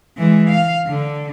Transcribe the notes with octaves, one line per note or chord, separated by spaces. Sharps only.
E3 G#3
F5
D3